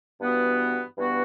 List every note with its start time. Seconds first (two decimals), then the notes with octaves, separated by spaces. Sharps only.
0.20 G2 E3 B3 F#4
0.96 G2 E3 B3 F#4